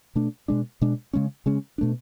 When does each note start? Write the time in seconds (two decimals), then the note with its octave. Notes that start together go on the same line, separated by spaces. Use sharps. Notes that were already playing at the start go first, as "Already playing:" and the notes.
0.15 B2 A3 D4
0.48 B2 G#3 D4
0.81 B2 G#3 D4
1.13 C#3 G#3 C#4
1.46 C#3 G#3 C#4
1.78 B2 A3 D4